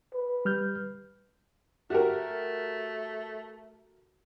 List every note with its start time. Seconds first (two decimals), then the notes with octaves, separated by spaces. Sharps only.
0.13 B4
0.45 G3 F6 G6
1.90 A3 F#4 G4 A#4